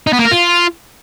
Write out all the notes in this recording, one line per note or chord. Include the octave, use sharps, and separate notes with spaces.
D#4
B3
A#3
A#4
F4